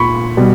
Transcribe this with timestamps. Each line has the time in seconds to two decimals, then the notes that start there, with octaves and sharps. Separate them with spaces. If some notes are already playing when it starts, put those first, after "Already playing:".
Already playing: A#2 B5 C#6
0.37 B2 G3